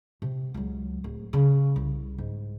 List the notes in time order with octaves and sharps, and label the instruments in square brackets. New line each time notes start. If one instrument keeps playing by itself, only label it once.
[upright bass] C3
C#2 F#3
D1
C#3
C2
G#2